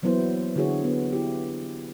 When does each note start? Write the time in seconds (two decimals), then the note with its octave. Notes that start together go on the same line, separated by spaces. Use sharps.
0.02 E3 F#3 A#3 B3 E4 C5
0.56 D3 E4 F#4 G#4 C#5
0.84 B3
1.13 E4 G4